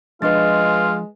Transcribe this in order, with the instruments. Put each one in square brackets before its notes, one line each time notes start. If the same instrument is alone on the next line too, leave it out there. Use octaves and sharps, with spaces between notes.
[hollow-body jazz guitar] F3 D4 C6 [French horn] G#3 [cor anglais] F4 [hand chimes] B4 D#5 A6